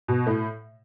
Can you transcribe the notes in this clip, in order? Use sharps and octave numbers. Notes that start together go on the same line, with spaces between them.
B2
A2